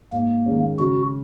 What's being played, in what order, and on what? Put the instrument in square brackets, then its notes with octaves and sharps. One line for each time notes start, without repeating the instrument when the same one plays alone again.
[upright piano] G#2 [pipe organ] A#3
[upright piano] D#3 G#3 C#4
[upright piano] C#3 [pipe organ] F#4